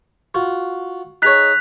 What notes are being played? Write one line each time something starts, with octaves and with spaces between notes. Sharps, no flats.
F4 F#4
D#4 G#4 C#5 F#6 B6 F7